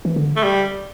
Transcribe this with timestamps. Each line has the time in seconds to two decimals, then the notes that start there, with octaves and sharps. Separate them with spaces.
0.05 E3
0.16 D3
0.36 A3
0.43 G3